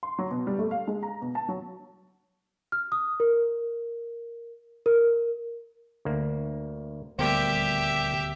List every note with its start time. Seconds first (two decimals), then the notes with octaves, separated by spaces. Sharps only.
0.03 C6
0.18 F#3
0.31 B2
0.47 G3
0.59 A3
0.71 F5
0.87 G#3
1.03 A#5
1.22 B2
1.35 A5
1.48 F#3
2.72 F6
2.92 D#6
3.20 A#4
4.86 A#4
6.05 D2 A#3
7.18 D#1 D2 G3 A#3 B3 G4 C5 E5